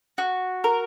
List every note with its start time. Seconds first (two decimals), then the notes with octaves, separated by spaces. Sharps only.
0.18 F#4
0.64 A#4